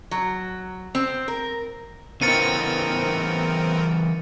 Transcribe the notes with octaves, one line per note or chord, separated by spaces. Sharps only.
F#3
C4
A#4
C#3 E3 B3 C4 A#4 A6 C#7 D#7